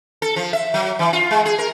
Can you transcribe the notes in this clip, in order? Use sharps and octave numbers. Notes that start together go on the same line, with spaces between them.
A4
F3
E5
F#3
E3
F4
G#3
G#4
A#4